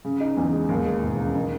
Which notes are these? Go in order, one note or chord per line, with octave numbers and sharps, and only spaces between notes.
C#3
D#4
E2
G#3
D#2
G#3
E1
C#3
D#3